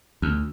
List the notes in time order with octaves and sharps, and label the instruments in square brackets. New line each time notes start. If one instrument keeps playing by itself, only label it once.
[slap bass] D2